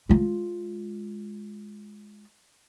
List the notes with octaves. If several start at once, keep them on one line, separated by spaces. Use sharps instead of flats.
G#3 F4